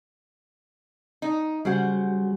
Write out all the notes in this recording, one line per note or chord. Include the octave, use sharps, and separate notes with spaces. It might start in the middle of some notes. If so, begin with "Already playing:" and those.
D#4
C#3 F#3 G3 C5 F#5